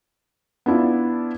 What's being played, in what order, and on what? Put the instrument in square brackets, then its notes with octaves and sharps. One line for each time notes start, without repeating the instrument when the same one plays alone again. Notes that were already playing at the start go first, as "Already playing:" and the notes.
[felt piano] B3 D4 E4 F4